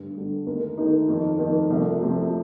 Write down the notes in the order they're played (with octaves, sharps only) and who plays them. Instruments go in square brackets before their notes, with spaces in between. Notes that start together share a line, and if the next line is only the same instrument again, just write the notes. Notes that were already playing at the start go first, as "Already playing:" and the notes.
Already playing: [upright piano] G2 D3 G3
G2 D3 G3
D#2 D#3 A3 D#4 A#4
D#2 D#3 A3 D#4 A#4
F2 D#3 A#3
F2 D#3 A#3
C2 C3 F3 A3 C4
C2 C3 F3 A3 C4